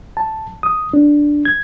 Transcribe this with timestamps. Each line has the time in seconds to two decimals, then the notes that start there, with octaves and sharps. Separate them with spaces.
0.17 A5
0.63 D#6
0.93 D4
1.45 G#6